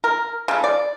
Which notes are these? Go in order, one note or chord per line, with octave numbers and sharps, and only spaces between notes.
A#4
C#3 A3
D5